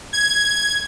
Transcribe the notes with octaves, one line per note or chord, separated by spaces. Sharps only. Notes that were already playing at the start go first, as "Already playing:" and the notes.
G#6